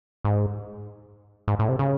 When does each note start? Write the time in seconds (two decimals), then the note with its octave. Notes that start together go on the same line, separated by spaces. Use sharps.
0.25 G#2
1.48 G#2
1.59 A2
1.69 C3
1.79 C#3